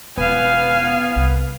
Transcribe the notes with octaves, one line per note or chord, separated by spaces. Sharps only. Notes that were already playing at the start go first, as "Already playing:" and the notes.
E1 B3 F5 G#5
C2